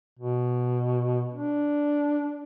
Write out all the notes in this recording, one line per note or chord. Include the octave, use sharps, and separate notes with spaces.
B2
D4